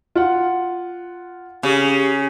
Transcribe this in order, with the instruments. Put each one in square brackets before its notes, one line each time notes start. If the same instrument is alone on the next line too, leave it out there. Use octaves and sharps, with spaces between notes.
[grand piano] F4 F#5
[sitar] C#3 [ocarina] G4